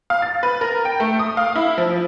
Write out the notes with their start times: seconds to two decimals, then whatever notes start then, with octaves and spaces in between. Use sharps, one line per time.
0.10 F5
0.22 A6
0.43 B4
0.61 A#4
0.85 G5
1.00 A3
1.19 D#6
1.37 F5
1.56 E4
1.78 F3